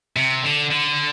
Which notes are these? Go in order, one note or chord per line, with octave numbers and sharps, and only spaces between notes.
C3
D3
D3